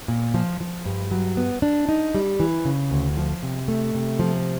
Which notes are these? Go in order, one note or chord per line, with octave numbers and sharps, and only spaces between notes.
A#2
F3
F3
G2
F#3
B3
D4
D#4
G3
E3
C#3
D2
F3
C3
A3
C3
F3